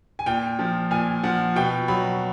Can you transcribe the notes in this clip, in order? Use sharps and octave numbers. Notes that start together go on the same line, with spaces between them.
G#5
A#2 G5
F3
A#2 G#5
F3 F#5
B2 G5
F#3 B5